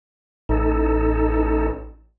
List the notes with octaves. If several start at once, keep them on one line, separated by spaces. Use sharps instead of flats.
A1 D#4 A4